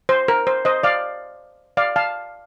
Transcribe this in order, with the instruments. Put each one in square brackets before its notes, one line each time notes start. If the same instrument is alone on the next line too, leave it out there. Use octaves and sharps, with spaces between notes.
[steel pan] C5
A#4
C5
C5 D#5
D5 F5
D5 F5
F5 A5